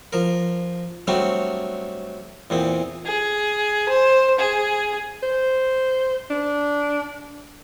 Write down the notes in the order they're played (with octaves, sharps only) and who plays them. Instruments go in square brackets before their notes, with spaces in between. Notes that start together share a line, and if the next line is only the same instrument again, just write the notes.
[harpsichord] F3 A#4
F#3 G3 A3 C4 D4 F#4
E2 A#2 C4
[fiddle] G#4
C5
G#4
[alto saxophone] C5
D4